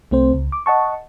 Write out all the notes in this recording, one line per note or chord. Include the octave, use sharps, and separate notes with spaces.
C2 A3 C4 C5
C#2
D6
D#5 F#5 A5 C#6